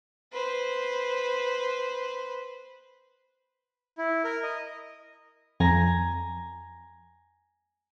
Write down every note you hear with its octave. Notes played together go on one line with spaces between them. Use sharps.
B4 C5
E4
A#4
D#5
F2 G#5 A#5